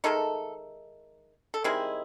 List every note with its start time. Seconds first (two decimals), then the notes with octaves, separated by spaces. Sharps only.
0.04 D#3 G#3 A3 D#4 A4
1.54 A4
1.64 D#3 G3 G#3 C4 E4 G#4